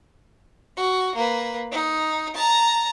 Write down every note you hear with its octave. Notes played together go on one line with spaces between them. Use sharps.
F#4
A#3 B4
D#4
A5 A#5